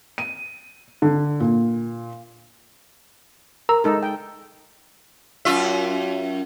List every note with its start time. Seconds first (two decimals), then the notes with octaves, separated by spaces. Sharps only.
0.18 D#7
1.02 D3
1.40 A#2
3.69 A#4 A#5 E6
3.84 G#3 D#4 A4
4.03 G5
5.45 F#2 F4 E5